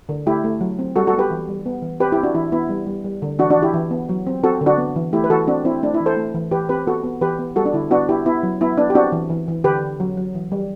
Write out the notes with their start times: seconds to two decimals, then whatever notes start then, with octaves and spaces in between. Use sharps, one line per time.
0.09 D3
0.26 A3 E4 G4
0.44 A3
0.61 F#3
0.79 C4
0.96 G3 F#4 A4
1.07 F#4 A4
1.14 B3
1.19 G4 B4
1.30 E3
1.49 G3
1.66 B3
1.82 E3
2.00 C4 G4 B4
2.12 C4 E4 G4
2.23 D4 F#4
2.34 E3 E4
2.52 B3 E4
2.69 G3
2.86 G3
3.05 G3
3.22 D3
3.39 E3 D4 F#4
3.50 D4 F#4
3.57 E3
3.62 E4 G4
3.73 E3
3.91 B3
4.09 F#3
4.27 C4
4.44 C4 F#4 A4
4.61 D3
4.66 D4 F#4
4.78 B3
4.96 E3
5.13 A3 E4 G4
5.24 B4
5.30 E3 F#4 A4
5.47 C4 D4 F#4
5.65 C4 E4
5.83 A3 D4
5.94 E4
6.01 E3
6.06 A4 C5
6.17 A3
6.34 E3
6.51 E3 G4 B4
6.69 C4 G4 B4
6.86 B3 F#4 A4
7.04 B3
7.21 E3 G4 B4
7.39 B3
7.56 G3 F#4 A4
7.65 D4
7.73 D3 E4
7.91 B3 D4 F#4
8.09 B3 E4 G4
8.26 B3 E4
8.43 F#3
8.61 B3 E4
8.78 B3 D4
8.90 G4
8.95 C4 D4 F#4
9.12 E3
9.30 E3
9.48 E3
9.64 D3 G4 B4
9.82 D3
10.00 F#3
10.17 F#3
10.35 E3
10.52 G3